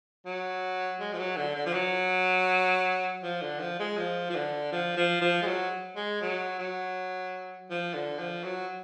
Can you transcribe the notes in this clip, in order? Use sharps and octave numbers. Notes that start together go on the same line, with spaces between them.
F#3
G#3
F3
F#3
D3
D3
F3
F#3
F3
D3
F3
G#3
F3
F3
D3
F3
F3
F3
G#3
F#3
G#3
F#3
F#3
F3
D3
F3
F#3